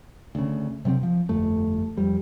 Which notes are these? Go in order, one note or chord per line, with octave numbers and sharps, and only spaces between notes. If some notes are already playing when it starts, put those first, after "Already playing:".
D2 C#3
C3 F#3 B3 C4
F3
G1 F2 A3
F2 G3